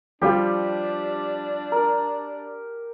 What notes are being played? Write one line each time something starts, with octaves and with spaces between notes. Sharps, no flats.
F3 G3 D4 F4 G4
A#4